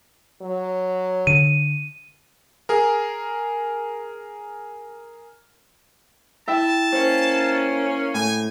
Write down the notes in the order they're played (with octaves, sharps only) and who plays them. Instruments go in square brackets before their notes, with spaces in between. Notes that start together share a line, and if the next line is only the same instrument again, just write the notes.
[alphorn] F#3
[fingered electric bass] D3 [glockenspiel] D#7
[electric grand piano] G#4 A#4
[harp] E4 E5 G5 [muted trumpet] A5
[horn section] A#3 C#4 [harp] C5
[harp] A2 [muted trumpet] G#5